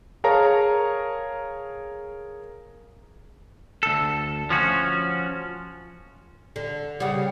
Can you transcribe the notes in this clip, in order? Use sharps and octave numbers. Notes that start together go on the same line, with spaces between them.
G#4 A#4 C#5 F5 A5 A#5
D2 A4
F3 C#4 F#4
D3
C#3 G3 F#5